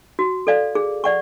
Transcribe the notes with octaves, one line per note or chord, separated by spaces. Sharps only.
F#4
A4 D5 F5
G#4
D5 F#5 C#6